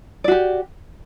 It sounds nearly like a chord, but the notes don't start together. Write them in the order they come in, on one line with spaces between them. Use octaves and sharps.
D5 F#4 G4